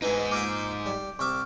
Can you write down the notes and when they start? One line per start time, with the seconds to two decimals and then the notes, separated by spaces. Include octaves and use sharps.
0.02 G#2 B2 E3 D#4 E4
0.32 A#3 F4 E5 D6 G6 D7
0.86 G3
1.19 C2 E5 C#6 D6 F6